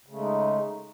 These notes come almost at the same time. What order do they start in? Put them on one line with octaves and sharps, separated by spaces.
C#3 A3 G#3 D#4